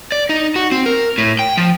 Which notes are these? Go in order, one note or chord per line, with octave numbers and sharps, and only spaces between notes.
D5
D#4
F#4
C4
A#4
A2
G5
F3